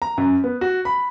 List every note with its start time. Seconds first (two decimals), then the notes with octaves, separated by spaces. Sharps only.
0.02 A#5
0.18 F#2
0.44 B3
0.61 F#4
0.85 B5